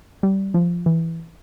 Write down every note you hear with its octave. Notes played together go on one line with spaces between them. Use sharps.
G3
F3
E3